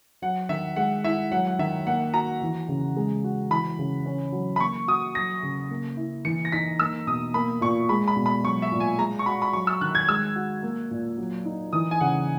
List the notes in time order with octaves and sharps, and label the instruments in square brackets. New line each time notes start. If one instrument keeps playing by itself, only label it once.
[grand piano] F#3 [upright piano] F#5
[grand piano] D#3 [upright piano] E5
[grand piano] G#3 [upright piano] F#5
[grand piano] E4 [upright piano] E5
[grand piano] F#3 [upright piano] F#5
[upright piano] F#5
[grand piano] D#3 [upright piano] E5
[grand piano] A#3 [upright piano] F#5
[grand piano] F#4 [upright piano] A#5
[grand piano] E3
C#3
G#3
F#4
[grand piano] E3 [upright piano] B5
[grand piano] C#3
C#4
F#3
[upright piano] B5
[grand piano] A#3 [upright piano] C#6
[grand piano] F#4 [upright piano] D#6
[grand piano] F#3 [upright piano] A#6
[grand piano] C#3
A#3
E4
[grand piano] E3 [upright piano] C#7
[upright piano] A#6
[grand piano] D#4 [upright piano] B6
[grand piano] A#3 [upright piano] E6
[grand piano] B2 [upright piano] D#6
[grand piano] A#3 [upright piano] B5
[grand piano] A#2 [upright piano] C#6
[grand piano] G#3 [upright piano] B5
[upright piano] B5
[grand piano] B2
[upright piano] B5
[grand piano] F#3 [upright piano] C#6
[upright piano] E5
[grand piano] A#2
[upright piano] G#5
[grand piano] G#3 [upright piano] A#5
[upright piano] C#6
[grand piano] F#4 [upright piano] B5
[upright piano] B5
[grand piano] F#3 [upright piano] C#6
[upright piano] E6
[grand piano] D#3 [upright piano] F#6
[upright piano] G#6
[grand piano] G#3 [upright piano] E6
[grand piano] F#4
A#3
A#2
F#3
D#4
[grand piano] E3 [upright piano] D#6
[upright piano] G#5
[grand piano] C#3 [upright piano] F#5